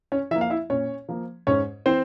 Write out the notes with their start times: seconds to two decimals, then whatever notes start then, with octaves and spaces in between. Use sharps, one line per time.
0.12 C#4 C#5
0.31 F3 E4 E5
0.36 A#3
0.41 F5
0.50 E4 E5
0.70 A#2 C#4 C#5
1.09 F3 A#3
1.47 G#2 C#4 C#5
1.86 E3 C4 C5